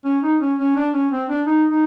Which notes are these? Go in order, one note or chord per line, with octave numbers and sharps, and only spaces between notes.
C#4
D#4
C#4
C#4
D4
C#4
C4
D4
D#4
D#4